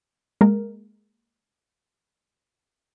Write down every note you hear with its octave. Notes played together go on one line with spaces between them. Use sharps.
G#3 A#3 A#4